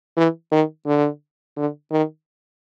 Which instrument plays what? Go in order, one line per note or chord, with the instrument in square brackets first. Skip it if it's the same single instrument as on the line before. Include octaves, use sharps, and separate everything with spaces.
[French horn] E3
D#3
D3
D3
D#3